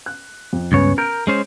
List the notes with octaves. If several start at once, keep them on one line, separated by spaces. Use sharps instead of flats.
F#6
F2
C#2 G2 C#3 B3 C#4 C#5
A#4 G6 D7
G#3 C#4 C5